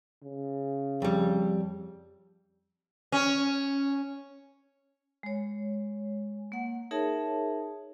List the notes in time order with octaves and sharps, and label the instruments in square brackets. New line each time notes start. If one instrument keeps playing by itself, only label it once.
[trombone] C#3
[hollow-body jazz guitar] F2 G3
[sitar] C#4
[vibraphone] G#3 C#5
A#3 F#5
D#4 G#4 A#4 C#5 E5 A5